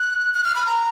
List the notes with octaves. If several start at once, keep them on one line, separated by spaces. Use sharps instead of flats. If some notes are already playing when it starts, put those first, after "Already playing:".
Already playing: F#6
F#6
F6
B5
A#5